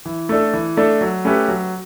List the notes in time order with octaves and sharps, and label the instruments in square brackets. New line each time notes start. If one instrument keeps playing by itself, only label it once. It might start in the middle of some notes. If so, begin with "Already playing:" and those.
[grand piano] E3
A3 D4 A4
E3
A3 D4 A4
F#3
A3 C#4 G4 B4
F#3